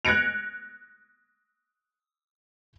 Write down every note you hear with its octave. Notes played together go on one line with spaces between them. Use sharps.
F#6 G#6 A#6 C#7 D7 F7